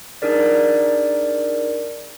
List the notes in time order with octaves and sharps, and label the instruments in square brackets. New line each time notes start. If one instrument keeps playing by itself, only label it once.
[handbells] D4 D#4 G#4 A#4 D5